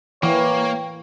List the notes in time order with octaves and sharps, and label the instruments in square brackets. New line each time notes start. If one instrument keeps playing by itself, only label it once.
[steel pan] E3 [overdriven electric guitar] A#3 [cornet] C#5 [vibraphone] G5